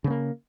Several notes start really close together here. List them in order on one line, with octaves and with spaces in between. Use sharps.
C#3 B3 A#3